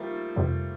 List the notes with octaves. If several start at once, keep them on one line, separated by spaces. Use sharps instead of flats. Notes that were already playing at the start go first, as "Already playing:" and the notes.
Already playing: F3 G3 A3 A#3
F2 C3 G3